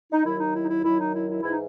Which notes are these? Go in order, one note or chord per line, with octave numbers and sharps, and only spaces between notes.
D#4
D#2 D#3 F#3 E4
D#4
E4
D#4
E4
F#2 D#3 F#3 E4
D#4
E4
E4
G#2 E3 E4
D#4